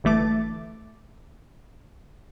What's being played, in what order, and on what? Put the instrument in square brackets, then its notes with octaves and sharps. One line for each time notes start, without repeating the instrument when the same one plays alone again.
[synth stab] G1 E3 A3 D6 A6